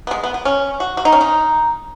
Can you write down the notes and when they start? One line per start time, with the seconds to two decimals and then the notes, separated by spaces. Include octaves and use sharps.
0.07 B3
0.11 G#3
0.23 B3
0.34 B3
0.45 C#4
0.80 F#4
0.97 F#4
1.05 D#4
1.12 C#4
1.21 D#4